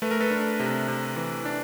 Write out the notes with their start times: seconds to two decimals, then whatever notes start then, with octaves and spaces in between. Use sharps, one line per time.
0.02 A3 B4
0.11 A#4
0.20 A4 B4
0.31 D4
0.60 C3
0.88 C3
1.16 E3
1.45 D4